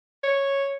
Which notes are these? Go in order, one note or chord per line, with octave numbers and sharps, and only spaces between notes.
C#5